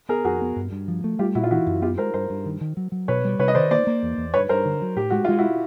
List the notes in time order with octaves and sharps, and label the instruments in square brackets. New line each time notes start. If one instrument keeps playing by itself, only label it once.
[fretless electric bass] B3 [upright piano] G#4 A#4
[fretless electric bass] F2 [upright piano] F#4 G#4
[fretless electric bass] B3
G2
G2
F3
A3
[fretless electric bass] G3 [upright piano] F4 G4
[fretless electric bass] A#2 [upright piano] E4 F#4
[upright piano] F4
[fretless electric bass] E3 [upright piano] E4 F#4
[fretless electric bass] F#2
[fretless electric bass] B3 [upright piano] F4 G4
[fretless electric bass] G#3 [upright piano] A#4 C5
[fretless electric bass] G2 [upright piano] A#4 C5
[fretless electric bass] G2
D#3
D#3
F#3
F#3
[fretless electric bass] B2 [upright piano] B4 C#5
[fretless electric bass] G3
[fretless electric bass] C3 [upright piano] B4 C#5
[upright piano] D#5
[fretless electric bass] D#3 [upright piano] C5 D5
[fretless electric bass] A#3 [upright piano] C5 D5
[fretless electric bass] A#3
E2
E2
[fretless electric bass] G2 [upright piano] B4 C#5
[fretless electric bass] G2 [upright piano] A#4 C5
[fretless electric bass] D3
F#3
[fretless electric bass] A2 [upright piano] G4
[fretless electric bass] G#3 [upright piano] F#4
[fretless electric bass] G#3 [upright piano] F4
[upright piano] E4 F#4